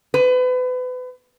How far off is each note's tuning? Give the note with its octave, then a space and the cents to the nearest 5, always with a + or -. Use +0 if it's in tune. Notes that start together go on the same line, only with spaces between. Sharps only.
B4 +30